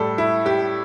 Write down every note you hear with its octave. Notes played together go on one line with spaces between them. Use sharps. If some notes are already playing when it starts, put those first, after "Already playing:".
Already playing: A2 G3 A4
E4
G4